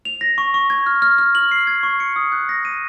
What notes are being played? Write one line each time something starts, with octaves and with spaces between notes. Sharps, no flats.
F7
A#6
C#6
C#6
G#6
F6
F6
F6
F#7
C7
G#6
C#6
C#7
D#6
F#6
A#6
D#7